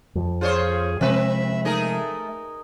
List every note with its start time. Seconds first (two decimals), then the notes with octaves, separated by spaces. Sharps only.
0.15 F2 F3
0.41 F4 G#4 C5 C#5
1.01 C3 F3 G#3 C4 B4 E5
1.65 A3 D#4 G#4 A#4